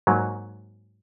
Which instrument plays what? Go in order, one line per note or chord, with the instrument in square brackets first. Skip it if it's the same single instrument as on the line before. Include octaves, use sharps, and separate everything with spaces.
[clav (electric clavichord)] G#2 F#3 A#3